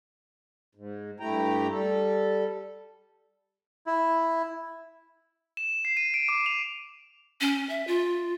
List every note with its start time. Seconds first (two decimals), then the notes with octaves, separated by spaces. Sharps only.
0.75 G#2
1.20 G2 A3 E4 G4 G5 A#5
1.71 G3 A4
3.86 E4
5.57 E7
5.85 C7
5.97 D#7
6.14 D7
6.29 D6
6.46 F7
7.41 C#4
7.69 E5
7.87 F4